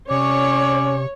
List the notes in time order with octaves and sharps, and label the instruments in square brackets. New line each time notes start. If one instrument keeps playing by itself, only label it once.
[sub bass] C3 [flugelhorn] C#4 [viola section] C#5 [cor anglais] D5